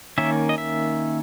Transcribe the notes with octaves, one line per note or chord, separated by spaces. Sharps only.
D#3 A#3 C#4 E5
D#5
E5